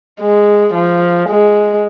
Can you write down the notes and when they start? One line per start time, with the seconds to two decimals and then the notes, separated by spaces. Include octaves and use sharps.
0.21 G#3
0.74 F3
1.29 G#3